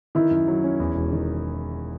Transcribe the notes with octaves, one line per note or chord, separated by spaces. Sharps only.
D#3 E4
F#2
F#3
C#4
E2
E1
D#3